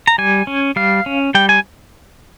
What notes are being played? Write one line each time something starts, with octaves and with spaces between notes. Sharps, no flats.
A#5
G3 G#5
C#4
G3 F5
C#4
G3 G5
G#5